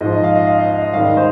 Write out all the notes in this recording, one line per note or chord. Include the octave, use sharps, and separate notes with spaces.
G#2 F3 D#5
D#5
F5
D#5
F5
D#5
D#5
D#5
G#2 D#3 G3 F5
D#5
C5